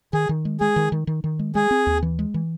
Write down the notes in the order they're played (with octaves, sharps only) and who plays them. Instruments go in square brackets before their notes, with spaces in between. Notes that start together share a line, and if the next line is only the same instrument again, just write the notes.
[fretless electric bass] D#3 [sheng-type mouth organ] G#4
[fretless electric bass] D#3
G#3
[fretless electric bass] G#3 [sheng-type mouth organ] G#4
[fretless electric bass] D#3
D#3
D#3
D#3
G#3
[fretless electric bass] G#3 [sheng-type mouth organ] G#4
[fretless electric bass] C4
D#2
E3
G#3
E3